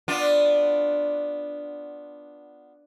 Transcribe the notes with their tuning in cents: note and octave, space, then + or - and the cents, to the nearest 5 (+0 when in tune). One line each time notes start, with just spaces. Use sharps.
B3 +0 D4 +0 F4 +10